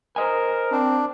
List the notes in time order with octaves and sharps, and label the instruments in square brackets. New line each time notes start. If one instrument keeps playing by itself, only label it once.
[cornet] A#4 [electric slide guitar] C5 D#5 G#5
[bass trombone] C4 [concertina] D4